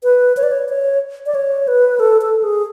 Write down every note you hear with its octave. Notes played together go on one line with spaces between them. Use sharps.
B4
C#5
D5
C#5
C#5
D5
C#5
B4
A4
A4
G#4